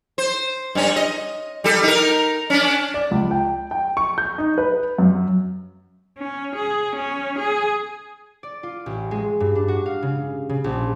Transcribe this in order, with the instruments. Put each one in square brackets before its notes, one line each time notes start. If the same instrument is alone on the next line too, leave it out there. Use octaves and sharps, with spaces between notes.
[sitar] C5
G2 C#4
D#5
G3 A4
D#4 A#4
C#4 D4
[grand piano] D5
C#2
G5
G5
C#6
G6
D#4
B4
F#2
[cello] C#4
G#4
C#4
G#4
[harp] D5
F4
A1
G#3
G2
D4
F#4
F5
C#3
C#3
A#1